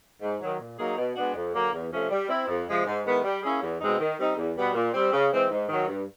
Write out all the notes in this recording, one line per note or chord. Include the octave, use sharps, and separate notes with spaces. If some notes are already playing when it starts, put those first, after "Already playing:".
G#2
D#3 F#3
A#2
F#3 A#3 D#4 G#4
B2
G#3 B3 D4 F#4
F2
D3 F#3 A#3
E2
C3 F3 A3 C#4
G3
C4 E4
F2
C3 F3 G#3
G#2
D#3 G#3 B3 E4
G3
A#3 C#4 E4 G#4
E2
B2 G#3 C4 D#4
D#3
G3 C4 D#4
E2
B2 G3 B3
A#2
G3 C4
C#3
E3 G#3 C4
G#2
D#3 F#3
G2